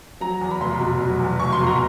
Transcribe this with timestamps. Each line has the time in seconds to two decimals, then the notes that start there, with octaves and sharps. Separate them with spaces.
0.21 F#3 A#5
0.41 E2
0.51 B5
0.61 F1 C6
0.80 B2
1.00 F#3
1.20 E2
1.40 F1 C#6
1.52 C6
1.60 B2
1.67 A#5